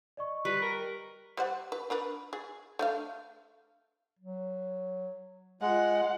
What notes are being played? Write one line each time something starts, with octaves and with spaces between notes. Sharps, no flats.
D5 D#5 C#6
G3 B4
A#4
G3 C5 F#5
B4
D4 A#4 B4
G#4
A3 D4 F5
F#3
G#3 F4 F#5